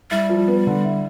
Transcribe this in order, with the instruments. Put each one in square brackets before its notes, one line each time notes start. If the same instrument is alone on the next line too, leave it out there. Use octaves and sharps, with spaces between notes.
[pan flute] G3 [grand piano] E4
[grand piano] F3
B3
D3
E4